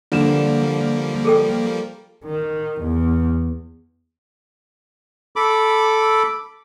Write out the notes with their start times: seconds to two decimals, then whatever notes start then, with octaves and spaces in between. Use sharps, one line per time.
0.12 D3 F3 G3 A#3 E7
1.25 G#4 A4 G5
2.25 D#3
2.82 E2
5.36 A4 B5 D6